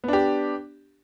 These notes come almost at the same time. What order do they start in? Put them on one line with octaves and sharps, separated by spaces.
B3 D4 G4